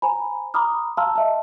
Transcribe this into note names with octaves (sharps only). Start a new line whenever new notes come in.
C5 G#5 A#5 B5
A#5 B5 D6 D#6 F6
F5 A5 A#5 C6 E6 F6
D#5 E5 A5